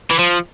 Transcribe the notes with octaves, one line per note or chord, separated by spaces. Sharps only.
E3
F3